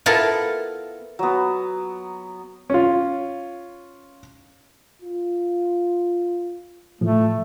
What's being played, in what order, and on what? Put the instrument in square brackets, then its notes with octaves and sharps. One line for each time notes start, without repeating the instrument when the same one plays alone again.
[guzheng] B3 E4 F4 A4 A#4
[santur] F#3 B3
[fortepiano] C#4 F4
[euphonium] F4
[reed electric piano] A2 F3 [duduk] A3